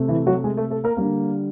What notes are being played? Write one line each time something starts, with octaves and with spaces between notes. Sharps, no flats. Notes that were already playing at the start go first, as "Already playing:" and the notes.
Already playing: C3 A3
E3 E4
F#3 F#4
G#3 G#4
A3 A4
A3 A4
A#3 A#4
D3 G3 A#3 A#4